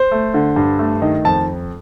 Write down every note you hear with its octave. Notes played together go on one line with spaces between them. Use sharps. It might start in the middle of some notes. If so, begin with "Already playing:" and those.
Already playing: C5
A3
D3
G2
A3
D#3 D#5
F2 A5